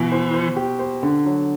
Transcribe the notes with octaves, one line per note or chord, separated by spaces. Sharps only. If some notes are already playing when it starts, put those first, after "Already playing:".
Already playing: B2 E3
C5
C5
G4
C5
D3
F#3